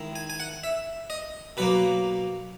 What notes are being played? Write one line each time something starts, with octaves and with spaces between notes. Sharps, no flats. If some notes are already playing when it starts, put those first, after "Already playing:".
Already playing: D#3 G#3 E4
G#5
G#5
F#5
E5
D#5
B2 F#3 A#3 B4